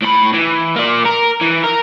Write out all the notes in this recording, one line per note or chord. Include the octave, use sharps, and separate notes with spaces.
A2 B5
E3
A#3 D5
A#4
E3
A#4